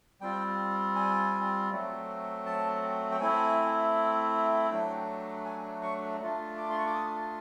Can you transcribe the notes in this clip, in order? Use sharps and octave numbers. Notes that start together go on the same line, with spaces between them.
G3 C4 F4 G5
G#5
F#3 A3 C4
A5
G5
A3 C4 E4 G#5
F#3 A3 D4 G5
G#5
C#6
A3 D4 F4
D6
C6
C#6
D6
D#6